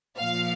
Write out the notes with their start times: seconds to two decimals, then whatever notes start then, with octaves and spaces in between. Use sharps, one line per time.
0.17 A#2 F3 F5